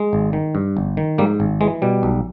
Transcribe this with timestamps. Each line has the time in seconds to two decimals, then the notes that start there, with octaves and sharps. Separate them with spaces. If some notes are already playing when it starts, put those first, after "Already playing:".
Already playing: G#3
0.13 G#1
0.33 D#3
0.55 G2
0.77 G1
0.97 D#3
1.18 G#2 G3 A#3
1.40 G#1
1.61 E3 G#3
1.82 B2 G3
2.03 B1